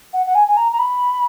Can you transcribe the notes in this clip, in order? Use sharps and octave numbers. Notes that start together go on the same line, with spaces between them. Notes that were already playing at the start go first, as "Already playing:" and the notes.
F#5
F#5
G#5
G#5
A#5
A#5
B5